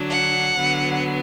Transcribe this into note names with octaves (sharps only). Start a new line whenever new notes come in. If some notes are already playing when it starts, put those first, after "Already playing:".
Already playing: D3 F#3 D4
F#5
D3 F#3 B3